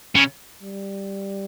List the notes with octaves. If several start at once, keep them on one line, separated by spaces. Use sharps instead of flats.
C#3
G3